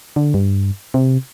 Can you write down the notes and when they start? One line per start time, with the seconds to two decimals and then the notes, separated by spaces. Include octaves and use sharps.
0.16 D3
0.34 G2
0.94 C3